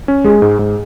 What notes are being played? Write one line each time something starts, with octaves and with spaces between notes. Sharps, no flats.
C#4
G#3 G#4
G#2
G#2